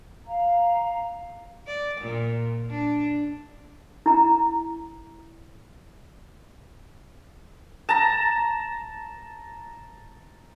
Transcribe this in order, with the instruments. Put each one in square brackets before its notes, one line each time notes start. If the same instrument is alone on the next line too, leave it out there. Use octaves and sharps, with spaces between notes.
[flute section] F5 A#5
[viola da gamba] D5
A#2
D4
[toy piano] E4 A#5
[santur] A5 A#5